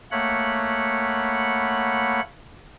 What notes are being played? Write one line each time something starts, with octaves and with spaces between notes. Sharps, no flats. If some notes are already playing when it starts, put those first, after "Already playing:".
A3 A#3 C#5 F#5 B5